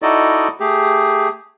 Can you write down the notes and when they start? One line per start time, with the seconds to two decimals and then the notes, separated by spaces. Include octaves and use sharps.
0.02 D#4 E4 F#4 A4 D5 D#5
0.60 A3 G4 G#4